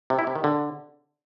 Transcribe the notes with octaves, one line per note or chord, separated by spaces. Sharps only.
C3
E4
C3
D#3
D3